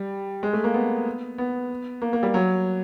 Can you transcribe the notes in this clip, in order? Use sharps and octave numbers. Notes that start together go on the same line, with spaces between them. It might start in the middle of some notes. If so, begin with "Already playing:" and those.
Already playing: G3
G#3
A3
A#3
B3
B3
A#3
A#3
G3
F#3